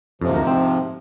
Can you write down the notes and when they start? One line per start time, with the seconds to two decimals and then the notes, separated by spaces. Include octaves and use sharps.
0.21 F2 G#2 C3 F3 C#4
0.33 D2 A#4
0.47 C4